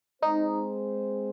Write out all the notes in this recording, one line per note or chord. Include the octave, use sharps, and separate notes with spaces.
G#3 C4 D#4 G#4 C5